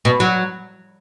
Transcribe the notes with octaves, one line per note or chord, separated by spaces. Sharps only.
B2
F#3